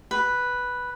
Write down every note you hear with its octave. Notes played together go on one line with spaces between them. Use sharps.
B4